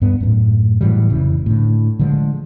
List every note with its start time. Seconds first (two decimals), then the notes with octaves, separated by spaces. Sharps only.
0.02 G2 B3
0.20 F#2 A2
0.81 A2 E3 F#3 G3
1.10 F1 C#3 E3
1.46 A2 D3
1.99 D3 F3 G#3